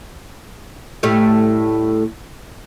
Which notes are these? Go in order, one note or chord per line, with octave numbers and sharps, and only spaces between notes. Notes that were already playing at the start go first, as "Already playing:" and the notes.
A2 G3 A3